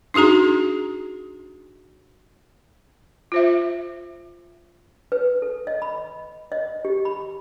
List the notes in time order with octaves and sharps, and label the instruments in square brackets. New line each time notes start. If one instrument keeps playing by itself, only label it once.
[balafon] D4 D#4 F#4 G#4 A#5
F4 C5 E5
[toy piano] B4
A4
D#5
B5
D#5
G4
B5